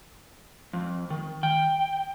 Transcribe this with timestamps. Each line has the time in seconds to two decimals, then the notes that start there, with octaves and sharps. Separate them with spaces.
0.73 F2
1.10 D#3
1.43 G5